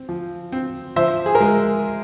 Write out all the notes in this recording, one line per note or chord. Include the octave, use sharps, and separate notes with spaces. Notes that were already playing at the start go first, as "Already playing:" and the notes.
Already playing: C4
F3
C4
F3 C5 E5
G#4
A#4
G#3